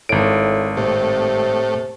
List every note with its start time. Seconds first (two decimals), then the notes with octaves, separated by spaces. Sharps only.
0.09 G#1 A2 D7
0.77 A2 C3